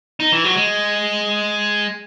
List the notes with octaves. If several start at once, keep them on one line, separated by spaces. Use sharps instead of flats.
D#4
E3
F#3
G#3